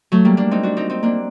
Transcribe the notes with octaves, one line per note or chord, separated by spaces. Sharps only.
F#3 A3
G3 A#3
A#3 D4
C4 D#4
D4 F#4
C4 D#4
C4 D#4
A#3 D4